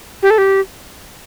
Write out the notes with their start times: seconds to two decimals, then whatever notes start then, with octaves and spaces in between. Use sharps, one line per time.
0.22 G4
0.30 A4
0.38 G4